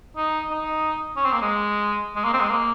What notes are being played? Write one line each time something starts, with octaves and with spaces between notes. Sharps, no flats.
D#4
D#4
C#4
C4
A#3
G#3
G#3
A#3
C4
G#3
A#3